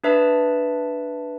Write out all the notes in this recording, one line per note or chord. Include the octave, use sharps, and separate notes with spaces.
D4 B4 E5 A5